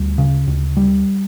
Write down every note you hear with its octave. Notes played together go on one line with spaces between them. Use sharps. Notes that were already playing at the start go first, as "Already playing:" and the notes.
Already playing: D2 G3
C#3
D2
G3